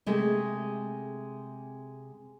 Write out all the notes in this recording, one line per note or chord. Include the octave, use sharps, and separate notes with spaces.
C3 G#3 A3